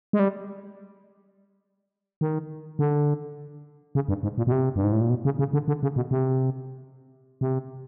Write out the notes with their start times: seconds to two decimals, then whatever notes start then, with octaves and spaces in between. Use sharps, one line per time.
0.13 G#3
0.19 G3
2.21 D#3
2.79 D3
3.95 C#3
4.09 G2
4.23 G#2
4.38 A#2
4.47 B2
4.52 C3
4.76 G2
4.84 G#2
4.92 A2
5.01 A#2
5.10 B2
5.25 C#3
5.39 C#3
5.53 D3
5.68 D3
5.83 C#3
5.96 B2
6.11 C3
7.41 C3